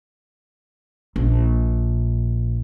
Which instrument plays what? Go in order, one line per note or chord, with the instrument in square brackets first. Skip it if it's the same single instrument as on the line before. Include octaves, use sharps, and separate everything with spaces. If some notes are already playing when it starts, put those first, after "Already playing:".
[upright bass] A#1